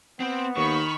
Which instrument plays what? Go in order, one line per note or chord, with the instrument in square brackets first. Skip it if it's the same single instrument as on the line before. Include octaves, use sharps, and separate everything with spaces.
[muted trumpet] B3 [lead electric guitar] C4
[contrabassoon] D#2 [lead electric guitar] D#3 [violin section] B5 C#6